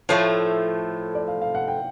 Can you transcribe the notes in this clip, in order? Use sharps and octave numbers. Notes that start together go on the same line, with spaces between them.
A2 F3 A3 C#5
D5
F5
F5
F#5
G5